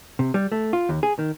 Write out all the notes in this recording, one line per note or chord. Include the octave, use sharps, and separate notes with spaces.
C3
G3
A3
F4
D#2
G#4
D#3